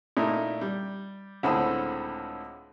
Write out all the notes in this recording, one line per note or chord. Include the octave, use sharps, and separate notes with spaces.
A#2 A3 D#4 E4
G3
C#2 A2 D3 C4 B5 D#6